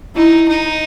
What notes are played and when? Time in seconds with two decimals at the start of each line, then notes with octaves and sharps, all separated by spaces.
0.15 D#4 E4
0.48 D#4